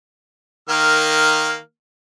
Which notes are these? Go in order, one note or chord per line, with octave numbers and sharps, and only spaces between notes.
D#3 A#3 F6